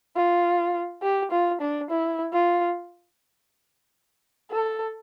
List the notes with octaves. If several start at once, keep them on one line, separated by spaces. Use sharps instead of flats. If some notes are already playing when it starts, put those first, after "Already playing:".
F4
G4
F4
D4
E4
F4
A4